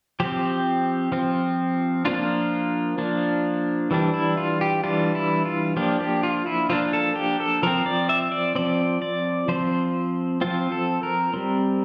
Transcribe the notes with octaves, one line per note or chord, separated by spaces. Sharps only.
F3 C4 G4
F3 C4
F3 A#3 D4 F4
F3 A#3 D4
E3 G3 D4
E4
F4
G4
E3 G3 D4 F4
E4
F4
F3 A#3 D4 G4
G4
F4
E4
F3 A#3 D4 F4
A4
G4
A4
F3 C4 A#4
D5
E5
D5
F3 C4 D5
D5
F3 C4 C5
F3 C4 F4
A4
A#4
G3 C4